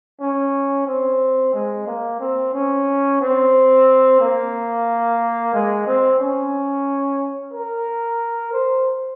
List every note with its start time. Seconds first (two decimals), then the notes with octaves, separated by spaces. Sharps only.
0.21 C#4
0.87 C4
1.54 G#3
1.87 A#3
2.20 C4
2.53 C#4
3.21 C4
4.21 A#3
5.54 G#3
5.87 C4
6.20 C#4
7.53 A#4
8.53 C5